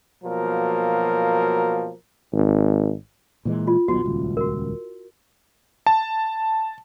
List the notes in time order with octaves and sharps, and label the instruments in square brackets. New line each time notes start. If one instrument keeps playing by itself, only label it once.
[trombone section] B2 F3 F#3 A#3 A#4
[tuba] G#1
[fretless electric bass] A#2 E3 G#3
[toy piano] F4
[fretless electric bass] D#1 B1 B2 [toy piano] F#4
[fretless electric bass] D#1 C#2
[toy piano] F#4 A#4
[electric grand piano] A5